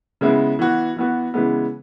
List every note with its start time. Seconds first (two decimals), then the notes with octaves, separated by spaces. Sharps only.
0.21 C#3 G#3 B3 E4
0.59 E3 B3 F#4
0.96 E3 B3 F#4
1.34 C#3 E3 G#3 B3